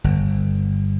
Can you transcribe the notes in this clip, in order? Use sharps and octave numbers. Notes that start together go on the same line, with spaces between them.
G1